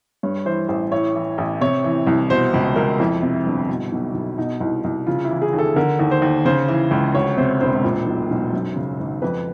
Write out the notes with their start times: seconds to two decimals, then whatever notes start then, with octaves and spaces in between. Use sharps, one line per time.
0.23 G2 C#5
0.46 E3 C5
0.68 A1 C5
0.92 A2 C#5
1.15 E3
1.38 A1
1.61 C3 C#5
1.84 E3
2.07 C2
2.30 B2 C5
2.54 C#2
2.76 C#2 A#4
2.99 F2 E4
3.23 C3
3.46 G1
3.69 B2
3.92 B1
4.14 B1
4.38 B2 D#4
4.60 C2
4.84 C2
5.07 C#3 F4
5.25 E4
5.30 E3
5.42 G#4
5.53 D#2
5.58 A4
5.76 D3 A#4
5.99 D#2
6.11 C5
6.22 D#2
6.45 C#3 C5
6.68 E3
6.91 C#2
7.15 D2 C#5
7.37 C3 C5
7.61 E1 C5
7.84 A#2
8.07 B1
8.31 B1
8.53 F#2
8.76 C#3
8.99 G#1
9.22 F2 B4